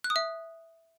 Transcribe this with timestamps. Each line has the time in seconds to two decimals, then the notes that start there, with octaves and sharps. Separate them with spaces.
0.04 F#6
0.10 D#6
0.16 E5